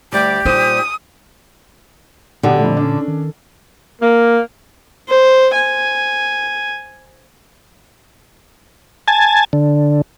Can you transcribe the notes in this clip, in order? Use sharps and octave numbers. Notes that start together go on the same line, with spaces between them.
D2 G3 G4 D5
A#2 G3 D#4 C5 D#6
B1 A#2 D3 G4 F#5
F2 A3
C#4 D4
D#3
A#3
C5
G#5
G#5 A5
D3